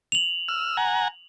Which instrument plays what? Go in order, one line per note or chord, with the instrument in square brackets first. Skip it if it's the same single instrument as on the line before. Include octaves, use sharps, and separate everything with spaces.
[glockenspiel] F7 F#7
[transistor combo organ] E6 F6
F#5 G#5 A#5